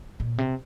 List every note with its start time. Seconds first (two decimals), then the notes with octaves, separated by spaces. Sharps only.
0.20 A#2
0.38 C3